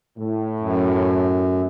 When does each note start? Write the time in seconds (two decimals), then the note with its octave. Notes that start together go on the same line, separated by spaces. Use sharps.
0.17 A2
0.60 F#2